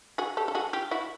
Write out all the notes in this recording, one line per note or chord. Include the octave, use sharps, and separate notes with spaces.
F#4 G#4
G4 A4
A4
F#4 G#4
F4 G4
E4 F#4